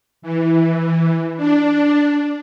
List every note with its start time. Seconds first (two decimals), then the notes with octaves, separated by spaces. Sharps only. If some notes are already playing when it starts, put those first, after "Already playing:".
0.22 E3
1.37 D4